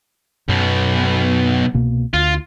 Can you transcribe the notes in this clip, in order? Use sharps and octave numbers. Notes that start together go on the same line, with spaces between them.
B1 F#2 B2
C2 B2 A#3
D2 F4